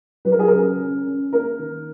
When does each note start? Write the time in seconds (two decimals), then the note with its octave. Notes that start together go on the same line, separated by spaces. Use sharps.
0.25 F#3 B4
0.32 A#4
0.39 G#4
0.47 C#3 A#4
0.79 C#4
1.06 C#4
1.33 A#3 A#4
1.59 D#3